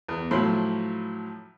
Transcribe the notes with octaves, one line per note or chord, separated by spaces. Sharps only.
E2
A2 F3 F#3 B5 C6